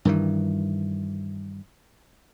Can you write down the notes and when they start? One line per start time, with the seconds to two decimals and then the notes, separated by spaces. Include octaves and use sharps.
0.05 G2 D#3 E3